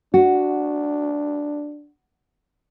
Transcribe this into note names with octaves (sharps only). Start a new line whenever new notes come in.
D4 F#4